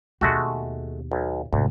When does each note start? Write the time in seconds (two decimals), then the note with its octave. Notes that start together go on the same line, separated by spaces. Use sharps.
0.21 D#2 B2 G#3 A3 F#4
1.12 B1
1.53 F1 D2 G#2